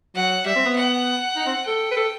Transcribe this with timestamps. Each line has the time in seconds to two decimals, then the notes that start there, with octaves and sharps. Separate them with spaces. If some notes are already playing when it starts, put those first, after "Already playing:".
0.15 F#3 F#5
0.45 G3 E5
0.56 C4
0.66 B3
0.76 F#5
1.36 D#4
1.46 C4
1.66 A4 G5
1.91 B4
1.97 A4